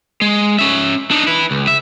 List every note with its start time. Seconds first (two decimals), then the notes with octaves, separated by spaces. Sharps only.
0.21 G#3
0.59 C#4 E5
1.11 D4 D#4
1.27 E4 B4
1.51 C#2
1.68 E5